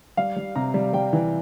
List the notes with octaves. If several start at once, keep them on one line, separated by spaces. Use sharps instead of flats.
G3 F5
G3
C3 A#5
G3
G3 G5
E3